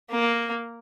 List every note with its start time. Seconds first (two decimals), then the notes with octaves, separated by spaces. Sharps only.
0.11 A#3